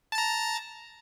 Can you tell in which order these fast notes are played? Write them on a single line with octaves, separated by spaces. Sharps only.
A5 A6 A#5